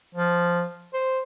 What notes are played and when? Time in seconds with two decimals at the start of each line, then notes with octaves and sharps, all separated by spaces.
0.15 F3
0.94 C5